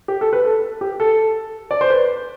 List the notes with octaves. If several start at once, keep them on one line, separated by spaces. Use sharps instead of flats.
G4
A4
B4
A4
G4
A4
D5
C5
B4